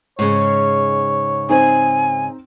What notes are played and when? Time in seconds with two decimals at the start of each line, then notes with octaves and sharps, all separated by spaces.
0.19 G#2 C#3 C#5
1.49 C4 D#4 G#5